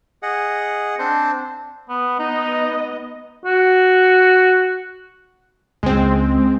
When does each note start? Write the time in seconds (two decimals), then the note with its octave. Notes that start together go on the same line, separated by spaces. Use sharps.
0.23 G#4 D#5 F#5
0.99 C4 D4 C5
1.89 B3
2.19 B3 D#4 D#5
3.45 F#4
5.83 C#2 G#3 C4